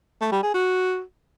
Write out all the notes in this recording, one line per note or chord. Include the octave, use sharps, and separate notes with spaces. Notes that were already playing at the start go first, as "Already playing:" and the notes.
A3
G3
G#4
F#4